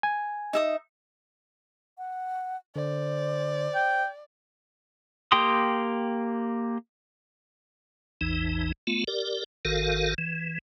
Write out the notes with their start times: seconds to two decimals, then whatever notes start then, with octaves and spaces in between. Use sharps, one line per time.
0.03 G#5
0.53 D#4 E5 D#6
1.98 F#5
2.76 D3 C5 D5
3.75 G5
5.32 A#3 G4 G5 C6 D#6
8.21 A1 E2 E3 D#4
8.87 A3 B3 F4
9.08 G4 A#4 D5
9.65 G#1 D#3 F#4 A4 A#4 F5
10.18 E3